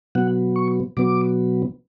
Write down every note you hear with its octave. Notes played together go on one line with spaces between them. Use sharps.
B2 F#3 B3 F#5
C#6
B2 F#3 B3 D6